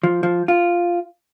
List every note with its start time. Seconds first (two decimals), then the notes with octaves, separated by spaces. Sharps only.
0.03 F3
0.23 F3
0.48 F4